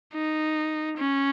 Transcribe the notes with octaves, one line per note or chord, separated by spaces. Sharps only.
D#4
C#4